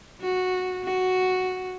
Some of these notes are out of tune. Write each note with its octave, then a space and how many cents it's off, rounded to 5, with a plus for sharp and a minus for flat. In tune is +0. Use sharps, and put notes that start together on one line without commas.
F#4 -10
F#4 +0